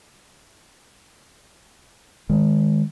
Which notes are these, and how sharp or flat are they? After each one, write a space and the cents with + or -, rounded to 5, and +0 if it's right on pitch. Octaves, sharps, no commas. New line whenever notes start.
D#3 +0 G#3 +0